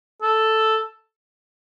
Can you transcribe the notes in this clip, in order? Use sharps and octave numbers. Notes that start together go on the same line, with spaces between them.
A4